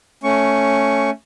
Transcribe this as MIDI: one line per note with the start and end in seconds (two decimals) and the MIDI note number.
0.23 1.10 57
0.23 1.10 61
0.23 1.10 85